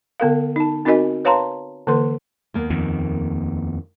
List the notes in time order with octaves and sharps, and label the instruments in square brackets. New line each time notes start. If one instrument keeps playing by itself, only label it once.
[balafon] D3 B3 A#4 F5
D#4 A5
C4 D#4 F#4 A#4 D#5 G#5
B4 C#5 F5 A5 A#5 C6
D3 E3 A#3 B4 C6
[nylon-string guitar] D#2 A#3 B3
[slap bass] F2 D#3